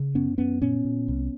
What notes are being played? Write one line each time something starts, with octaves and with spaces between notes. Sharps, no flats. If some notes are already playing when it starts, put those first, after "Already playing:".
Already playing: C#3
F#2 B3 C#4
F#2 B3 C#4
A#2 B3 C#4
A#2
C2